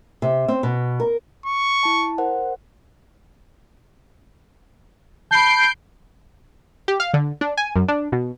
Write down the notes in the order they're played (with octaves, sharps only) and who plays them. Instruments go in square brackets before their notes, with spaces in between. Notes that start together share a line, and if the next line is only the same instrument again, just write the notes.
[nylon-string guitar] C3
C4
B2
A#4
[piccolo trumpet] C#6
[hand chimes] E4 A5
A#4 C5 F#5
[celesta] A5 B5 [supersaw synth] G6 C7 D7
[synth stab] G4
F5
D3
D4
G#5
F#2
D4
B2